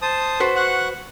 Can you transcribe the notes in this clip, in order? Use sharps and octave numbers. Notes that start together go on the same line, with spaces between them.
C5 A5 D#6
F#4 B4 C5
F#5 C#6 F#6